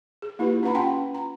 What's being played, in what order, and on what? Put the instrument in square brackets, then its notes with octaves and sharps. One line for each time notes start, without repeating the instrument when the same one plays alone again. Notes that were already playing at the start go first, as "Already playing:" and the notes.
[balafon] G#4
A#3 E4 F4 G4 B4
C#4 F4 B4 F#5 A#5 B5
C#4 F4 F#5 G5 A5 C6
A#5